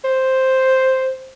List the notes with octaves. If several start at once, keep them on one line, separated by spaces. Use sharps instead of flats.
C5